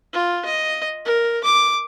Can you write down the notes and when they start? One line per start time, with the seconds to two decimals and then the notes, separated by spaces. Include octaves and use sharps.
0.13 F4
0.45 D#5
1.05 A#4
1.44 D6